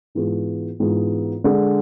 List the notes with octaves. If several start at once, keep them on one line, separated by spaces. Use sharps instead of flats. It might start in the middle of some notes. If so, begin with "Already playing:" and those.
G#2 E3 B3 F4 G#4
G#2 E3 B3 F4 G#4
D3 G#3 D4